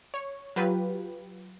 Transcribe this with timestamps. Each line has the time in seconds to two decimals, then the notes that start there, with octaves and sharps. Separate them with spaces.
0.14 C#5
0.56 F#3 F4 G4 B4